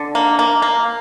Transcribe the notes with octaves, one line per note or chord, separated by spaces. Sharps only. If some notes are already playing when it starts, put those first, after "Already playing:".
Already playing: D3
A#3
A#3
A#3